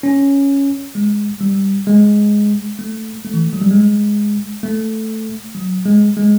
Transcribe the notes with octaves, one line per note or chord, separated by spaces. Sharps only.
C#4
G#3
G3
G#3
A3
A3
E3
F3
F#3
G3
G#3
A3
F#3
G#3
G#3